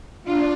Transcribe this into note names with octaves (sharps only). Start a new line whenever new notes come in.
D4 F4